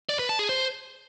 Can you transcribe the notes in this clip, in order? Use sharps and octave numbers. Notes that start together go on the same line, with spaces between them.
D5
B4
A5
G#4
C5